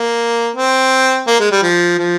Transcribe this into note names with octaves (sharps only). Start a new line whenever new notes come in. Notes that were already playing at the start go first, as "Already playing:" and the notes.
Already playing: A#3
C4
A#3
G#3
G3
F3
F3